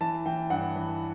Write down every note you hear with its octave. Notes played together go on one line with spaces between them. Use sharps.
E3 A5
E3 G5
G2 F#5
E3